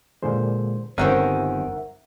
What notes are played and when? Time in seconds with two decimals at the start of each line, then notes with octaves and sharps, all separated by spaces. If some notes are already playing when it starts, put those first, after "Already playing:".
0.23 A#2 D3 G#3 C5
0.98 G1 D#3 C4 C#4 A#4 E5 F#5 G5